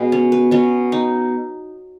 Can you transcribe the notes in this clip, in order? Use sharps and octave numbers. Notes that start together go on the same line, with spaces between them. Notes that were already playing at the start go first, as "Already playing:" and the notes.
Already playing: B2 G#3 B3
C#4
B4
B2 F#3 B3 C#4
D#4